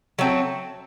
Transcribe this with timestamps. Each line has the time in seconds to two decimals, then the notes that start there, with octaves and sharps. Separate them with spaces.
0.19 F#3 A3 C4